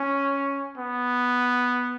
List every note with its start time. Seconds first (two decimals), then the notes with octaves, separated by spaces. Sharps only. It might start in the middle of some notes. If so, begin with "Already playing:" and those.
Already playing: C#4
0.78 B3